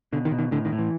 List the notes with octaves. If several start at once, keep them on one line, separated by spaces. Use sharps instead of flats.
B2 D3
D#3
B2
D#3
A2 D3
D#3
A2
E3